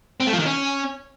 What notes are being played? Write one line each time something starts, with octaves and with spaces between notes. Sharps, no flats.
C4
A3
F3
D#3
C#4